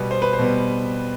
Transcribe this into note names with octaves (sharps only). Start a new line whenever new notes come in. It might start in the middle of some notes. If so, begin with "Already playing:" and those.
Already playing: B2 G3 B3 B4
C5
B4
C5
B2 G3 B3